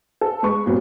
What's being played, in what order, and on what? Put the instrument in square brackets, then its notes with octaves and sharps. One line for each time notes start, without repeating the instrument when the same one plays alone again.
[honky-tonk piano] A4
G#3 B4 C#6
A#2 F#3 G3 B3 C4